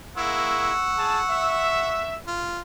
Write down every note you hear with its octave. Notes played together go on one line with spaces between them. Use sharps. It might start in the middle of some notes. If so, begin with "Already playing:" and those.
G#3 A#3 E4 F#5 C#6 E6
G#4 A5
E5
F4